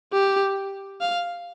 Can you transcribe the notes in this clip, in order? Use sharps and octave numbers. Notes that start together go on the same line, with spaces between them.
G4
F5